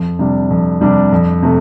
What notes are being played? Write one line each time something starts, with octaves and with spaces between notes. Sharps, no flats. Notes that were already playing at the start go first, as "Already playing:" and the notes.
Already playing: F2
C3 G3 D4
F2
C3 G3 D4
F2
C3 A3